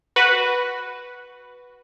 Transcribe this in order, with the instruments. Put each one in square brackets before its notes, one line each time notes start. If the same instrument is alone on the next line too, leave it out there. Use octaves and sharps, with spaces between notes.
[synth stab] F#4 B4